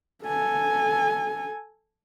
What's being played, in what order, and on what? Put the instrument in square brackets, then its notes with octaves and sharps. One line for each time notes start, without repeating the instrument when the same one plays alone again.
[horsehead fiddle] A4 G#5